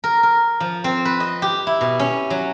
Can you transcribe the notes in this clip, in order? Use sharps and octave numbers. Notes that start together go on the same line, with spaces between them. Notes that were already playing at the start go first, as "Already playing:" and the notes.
A#4
A#4
F3
C4
B4
D#5
G4
E4
B2
C#4
F#3